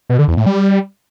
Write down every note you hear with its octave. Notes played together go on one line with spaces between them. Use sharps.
B2
D3
E2
A2
G3